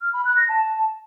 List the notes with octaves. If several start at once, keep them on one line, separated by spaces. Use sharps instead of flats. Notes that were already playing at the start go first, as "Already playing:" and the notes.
F6
B5
F#6
A#6
A5